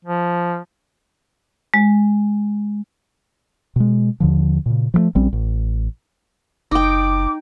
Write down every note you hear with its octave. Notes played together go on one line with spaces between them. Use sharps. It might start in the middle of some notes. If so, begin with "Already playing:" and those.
F3
G#3
B2 G#3
D#2 D3 F3
A#2 C#3
F3 F#3 A3
A#1 G3 C4 C#4
A1
F#1 D#4 G5 D6